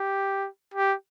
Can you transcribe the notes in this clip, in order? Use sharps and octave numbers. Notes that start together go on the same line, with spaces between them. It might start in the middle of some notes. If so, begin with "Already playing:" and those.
Already playing: G4
G4